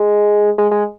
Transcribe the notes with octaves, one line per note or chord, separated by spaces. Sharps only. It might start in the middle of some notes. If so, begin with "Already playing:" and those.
Already playing: G#3
G#3
G#3